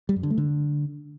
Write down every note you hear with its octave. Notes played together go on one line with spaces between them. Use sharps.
G3
F#2
D3
A3
D3